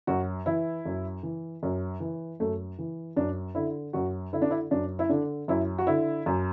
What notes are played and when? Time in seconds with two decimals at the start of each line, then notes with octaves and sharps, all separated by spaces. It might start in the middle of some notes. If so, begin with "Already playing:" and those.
0.07 F#2 F#4
0.46 E3 E4
0.85 F#2
1.23 E3
1.63 F#2
2.00 E3
2.40 F#2 A3
2.79 E3
3.16 F#2 D4
3.55 D3 E4
3.93 F#2 F#4
4.33 D3 E4
4.42 D4
4.51 E4
4.71 F#2 D4
4.99 E4
5.09 D3 D4
5.48 F#2 E4
5.78 F#4
5.87 D3 E4
6.26 F#2